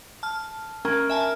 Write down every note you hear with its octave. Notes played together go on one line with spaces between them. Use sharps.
A5 F6
C#4 A#4
E5 G#5 A5